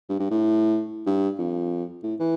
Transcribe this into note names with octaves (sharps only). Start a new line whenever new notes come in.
G2
G2
A2
G2
F2
A2
E3